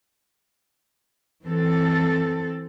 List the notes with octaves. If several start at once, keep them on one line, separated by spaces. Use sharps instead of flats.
E3 C4 A4